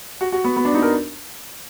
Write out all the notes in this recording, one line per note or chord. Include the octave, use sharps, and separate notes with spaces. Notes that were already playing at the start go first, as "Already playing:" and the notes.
F#4
F#4
B3
B3
D4
D#4
A#4